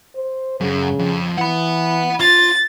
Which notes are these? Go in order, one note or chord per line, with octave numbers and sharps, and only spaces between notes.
C5
F#2 C#3
F2
E3 F#5 B5
F4 A6